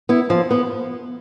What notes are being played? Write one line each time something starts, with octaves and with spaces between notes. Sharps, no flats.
B3 E4
F3
B3